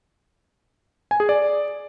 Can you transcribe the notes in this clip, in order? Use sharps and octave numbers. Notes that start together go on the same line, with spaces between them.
G#5
G#4
D5